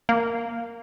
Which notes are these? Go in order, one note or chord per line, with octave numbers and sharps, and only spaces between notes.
A#3